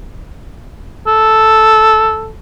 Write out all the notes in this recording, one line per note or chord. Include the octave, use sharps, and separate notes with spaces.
A4